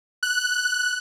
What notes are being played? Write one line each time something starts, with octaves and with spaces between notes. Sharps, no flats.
F#6